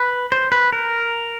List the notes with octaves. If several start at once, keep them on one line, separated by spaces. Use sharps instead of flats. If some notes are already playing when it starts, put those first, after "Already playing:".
Already playing: B4
C5
B4
A#4